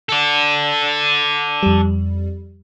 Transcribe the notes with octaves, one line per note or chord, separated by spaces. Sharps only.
A4 D5
F2 G3